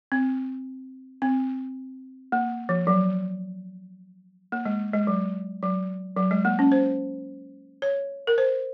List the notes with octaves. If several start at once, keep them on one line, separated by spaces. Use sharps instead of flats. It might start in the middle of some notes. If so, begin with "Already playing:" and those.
C4
C4
A#3
F3
F#3
A#3
G#3
G#3
F#3
F#3
F#3
G#3
A#3
C#4
C5
C#5
A#4
C5